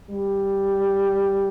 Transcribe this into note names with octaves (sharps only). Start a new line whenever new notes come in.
G3